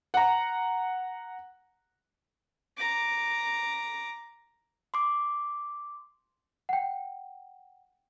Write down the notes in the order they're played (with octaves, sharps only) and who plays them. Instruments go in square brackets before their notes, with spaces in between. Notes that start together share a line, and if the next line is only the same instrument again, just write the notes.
[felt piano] F#5 A#5
[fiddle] A#5 D6
[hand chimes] C6 D6
[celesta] F#5 G5